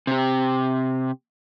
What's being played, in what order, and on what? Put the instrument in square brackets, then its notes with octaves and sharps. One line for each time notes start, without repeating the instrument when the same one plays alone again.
[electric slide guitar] C3 G4